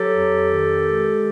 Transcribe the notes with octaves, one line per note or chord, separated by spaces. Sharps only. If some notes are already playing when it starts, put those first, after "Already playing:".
Already playing: F#3 G4 A4
F2
D#3
G#3